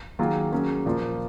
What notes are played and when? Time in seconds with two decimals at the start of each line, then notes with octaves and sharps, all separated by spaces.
0.19 D#3 F#3 A#3 F4 G#4
0.52 F#3 A#3 C#4 G#4
0.86 A#2 F3 A#3 F4